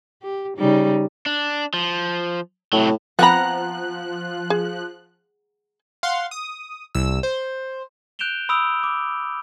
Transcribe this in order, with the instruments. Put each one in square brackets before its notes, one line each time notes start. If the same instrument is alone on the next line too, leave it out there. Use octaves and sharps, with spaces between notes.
[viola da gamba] G4
C#3 G3 D#4
[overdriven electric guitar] D4
F3
[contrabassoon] A2 [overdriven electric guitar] C3 F#3
[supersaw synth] F3 F#6 [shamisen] B3 C4 B5 [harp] F#5 A#5
[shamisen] G#4
[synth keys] F5 F#5 C6
D#6
C2 E6
C5
[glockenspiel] F#6 G6 D7 E7 F7 G7
B5 D#6 E6 D7 F7
D6